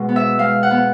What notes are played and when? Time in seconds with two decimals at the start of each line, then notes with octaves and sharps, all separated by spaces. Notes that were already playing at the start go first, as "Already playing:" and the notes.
Already playing: B2 G#3
0.09 B3
0.16 E5
0.39 G#3 F5
0.63 F#5
0.71 B3